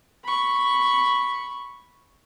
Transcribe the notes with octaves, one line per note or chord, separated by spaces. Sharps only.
B5 C#6